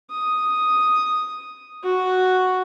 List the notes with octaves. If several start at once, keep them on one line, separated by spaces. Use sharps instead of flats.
D#6
F#4